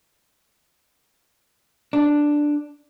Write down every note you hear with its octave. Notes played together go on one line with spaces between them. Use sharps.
D4